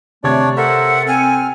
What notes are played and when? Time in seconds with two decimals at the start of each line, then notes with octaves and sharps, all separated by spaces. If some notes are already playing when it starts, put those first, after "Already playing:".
0.24 C3 A3 D4 C#5 D5 G#6
0.57 A4 A#4 C5 E5 F#5
1.08 C4 G#5 F6